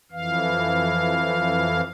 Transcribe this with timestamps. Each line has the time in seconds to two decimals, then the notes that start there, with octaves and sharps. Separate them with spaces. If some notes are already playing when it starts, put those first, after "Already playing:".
0.12 F2 E3 F5